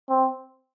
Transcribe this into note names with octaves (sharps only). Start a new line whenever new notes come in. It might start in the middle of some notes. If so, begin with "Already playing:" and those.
C4